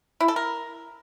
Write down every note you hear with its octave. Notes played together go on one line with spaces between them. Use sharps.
E4
A4
A#4